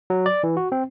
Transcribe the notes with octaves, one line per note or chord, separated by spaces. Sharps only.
F#3
D5
E3
F#4
C4